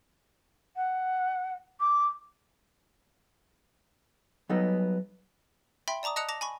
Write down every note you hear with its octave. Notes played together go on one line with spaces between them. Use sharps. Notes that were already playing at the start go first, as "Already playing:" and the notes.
F#5
D6
F#3 G3 B3 D#4 A4 D#5
E5 G5 B5 C6
D5 A5 A#5 D6 D#6
D#5 A5 D#6 F#6 C#7 F7
A5 D6 A#6 F7
G#5 B5 C#6